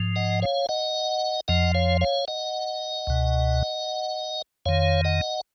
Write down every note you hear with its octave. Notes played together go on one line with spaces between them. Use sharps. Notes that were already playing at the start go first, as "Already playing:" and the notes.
Already playing: G#2 F3
D#5 F#5
C#5 F5
D#5 F#5
F2 F3 D#5 F#5
C#5 F5
C#5 F5
D#5 F#5
C#2 B2
F2 D#3 C#5 F5
D#5 F#5